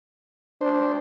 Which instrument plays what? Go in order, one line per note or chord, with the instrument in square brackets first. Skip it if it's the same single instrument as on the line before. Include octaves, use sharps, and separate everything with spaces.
[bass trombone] D4 [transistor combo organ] C5